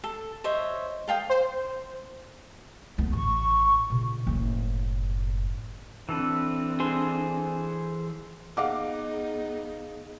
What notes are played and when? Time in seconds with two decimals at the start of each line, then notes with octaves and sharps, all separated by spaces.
0.04 A4
0.44 C5 C#5 D#5 E5
1.08 A4 F5 G5 D#6
1.30 C5
2.98 D2 B3
3.13 A1 C#6
3.90 A#2 C#3
4.27 F#1 A2
6.09 E3 C4 D4 A4 B4
6.80 G#4 C5
8.57 B3 D#4 G#4 F5 F#5 D6